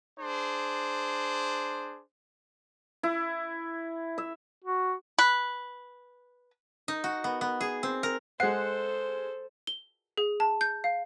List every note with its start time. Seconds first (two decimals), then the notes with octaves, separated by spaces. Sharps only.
0.18 D4 G#4 C5
3.03 E4
4.18 E5
4.64 F#4
5.19 B4
6.88 D#4
7.04 F#4
7.24 B3
7.41 B3
7.61 G#4
7.83 C4
8.03 A#4
8.40 G#3 A4 C5 F#5 C7
9.67 G7
10.17 G#4
10.40 A5
10.61 G6
10.84 F5